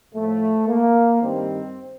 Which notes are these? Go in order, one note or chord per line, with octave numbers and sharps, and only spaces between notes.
A2 F3 A3
A#3
G2 D#3 G3 C4